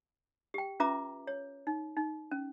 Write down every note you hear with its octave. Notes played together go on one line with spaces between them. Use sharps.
G4 G5
C#4 F4 B4 E5 A#5 D6
C#5
D#4
D#4
C#4